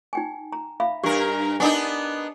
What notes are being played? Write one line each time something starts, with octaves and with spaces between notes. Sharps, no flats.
D#4 G5 G#5
A#5
E5 F5 B5
G2 G4 A#4
B3 D4 D#4 G#5